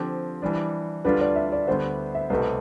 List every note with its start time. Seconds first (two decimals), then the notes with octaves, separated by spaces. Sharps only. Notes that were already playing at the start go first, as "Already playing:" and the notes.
Already playing: D3 F3 C4 G4 C5
0.42 E3 G3 D4
1.04 D2 D3 G3 D4 F4 B4
1.21 D5
1.36 E5
1.52 D5
1.67 D2 D3 G3 B3 C5
2.15 E5
2.30 C2 B2 A3 C4 G4 B4